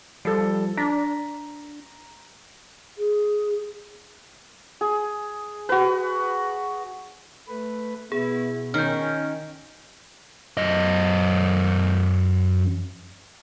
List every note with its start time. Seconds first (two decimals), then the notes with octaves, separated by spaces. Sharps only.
0.25 F3 G3 A4
0.77 D4 A#5 A#6 B6
2.98 G#4
4.81 G#4
5.69 F#4 B4
7.48 A3 B4
8.12 B2 B3 E4 G#4
8.74 D#3 C#4 F6 G6
10.57 F#2 D#5